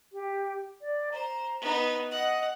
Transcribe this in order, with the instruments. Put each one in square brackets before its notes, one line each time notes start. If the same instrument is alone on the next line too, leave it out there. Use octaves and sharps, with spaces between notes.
[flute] G4
D5
[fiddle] C5 [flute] A#5
[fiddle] B3 D#4
[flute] D#5 [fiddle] F#5